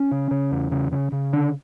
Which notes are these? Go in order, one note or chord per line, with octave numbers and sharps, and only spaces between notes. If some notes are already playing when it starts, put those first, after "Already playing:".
Already playing: C#4
C#3
C#3
E2
C#3
C#3
C#3
D3 D4